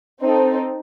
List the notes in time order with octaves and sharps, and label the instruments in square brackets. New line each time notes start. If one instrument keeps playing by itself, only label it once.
[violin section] C4 D#4 A4